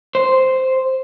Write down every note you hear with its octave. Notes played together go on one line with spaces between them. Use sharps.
C5